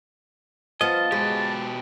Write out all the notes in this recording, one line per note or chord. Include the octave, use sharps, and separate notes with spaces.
F3 B3 D#5 A5
B2 G#3 G4